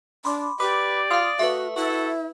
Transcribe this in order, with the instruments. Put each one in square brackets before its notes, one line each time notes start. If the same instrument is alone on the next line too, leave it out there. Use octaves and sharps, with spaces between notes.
[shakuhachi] D4 [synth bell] B5 C6 D6
[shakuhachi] G4 [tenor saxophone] B4 [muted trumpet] D5 [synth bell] D6
[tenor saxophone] F4 [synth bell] F5 D#6
[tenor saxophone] A3 [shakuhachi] F#4 [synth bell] B4 E5
[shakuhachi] E4 [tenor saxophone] F#4 [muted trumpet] A4